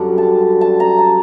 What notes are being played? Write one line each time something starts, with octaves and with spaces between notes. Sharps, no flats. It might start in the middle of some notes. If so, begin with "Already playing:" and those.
Already playing: F#2 D3 G3 F#5
A5
A5
A#5
A5